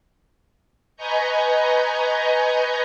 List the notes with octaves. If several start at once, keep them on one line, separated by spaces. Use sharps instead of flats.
B4 D#5 G#5 A#5 C#6 G6